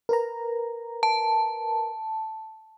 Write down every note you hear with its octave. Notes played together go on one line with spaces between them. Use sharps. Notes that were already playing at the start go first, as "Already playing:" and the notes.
A#4 B4 A#5
A5